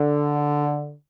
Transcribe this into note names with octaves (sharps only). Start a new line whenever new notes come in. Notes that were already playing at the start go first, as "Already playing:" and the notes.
Already playing: D3